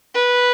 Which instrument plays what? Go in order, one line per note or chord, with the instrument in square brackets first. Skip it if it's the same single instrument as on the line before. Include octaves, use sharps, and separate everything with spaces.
[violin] B4